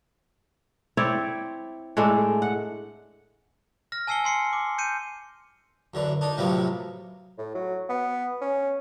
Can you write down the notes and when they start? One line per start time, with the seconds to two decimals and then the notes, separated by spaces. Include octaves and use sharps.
0.97 C4 E4 C#5 D5
1.97 A2 G#3 A3 D4
2.42 F#5
3.92 F6 A#6
4.07 G#5 A5 E6 C7 C#7 G7
4.24 G#5 C6 C7 C#7
4.53 D6
4.78 G6 C#7 D#7
5.94 F#2 D3 E3
6.21 D4 D#4
6.37 A2 C3 F3 F#3 A#3 B3
7.38 A2
7.55 F#3
7.89 B3
8.41 C#4